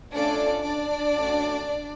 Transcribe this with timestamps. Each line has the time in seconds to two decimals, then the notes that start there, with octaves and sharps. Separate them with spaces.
0.13 A3 C#4 D4 F4 A4 D5
0.64 D4 D5
1.15 A3 C#4 F#4